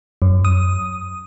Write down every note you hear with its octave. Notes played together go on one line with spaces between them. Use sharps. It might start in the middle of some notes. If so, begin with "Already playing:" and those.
F#2
D#6